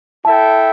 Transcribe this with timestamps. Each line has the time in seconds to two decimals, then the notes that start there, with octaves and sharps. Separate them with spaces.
0.25 E4 A4 E5 G5 A5